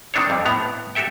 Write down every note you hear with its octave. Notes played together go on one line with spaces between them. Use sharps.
D#3 C4 D4 A4 C#5
F2 G3
A2 B3 A#5
F#4 G4 A4 E5 G5